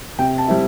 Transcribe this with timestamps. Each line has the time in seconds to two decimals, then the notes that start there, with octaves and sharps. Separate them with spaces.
0.19 C3 G5
0.38 A5
0.48 G3 C4 E4